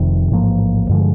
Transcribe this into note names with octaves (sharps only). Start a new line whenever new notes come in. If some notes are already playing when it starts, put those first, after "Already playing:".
Already playing: F1 F2 C3 D#3
A1 G#2 F3 A#3
G2 D3 F3 G#3